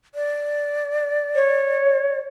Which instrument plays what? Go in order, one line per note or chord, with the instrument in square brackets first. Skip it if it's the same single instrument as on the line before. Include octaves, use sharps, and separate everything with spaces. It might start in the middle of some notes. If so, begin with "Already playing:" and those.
[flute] D5
[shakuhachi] C#5